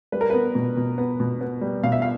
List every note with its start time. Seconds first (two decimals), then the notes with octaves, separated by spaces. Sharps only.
0.12 G3 B4
0.21 A#4
0.30 B3 B4
0.55 B2
0.77 B2
0.98 B3
1.20 B2
1.41 B3
1.61 G3
1.83 B2 F5
1.92 E5
2.02 F5